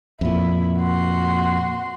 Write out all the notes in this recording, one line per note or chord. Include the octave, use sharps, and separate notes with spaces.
F2 A#2 E4
F#4 C6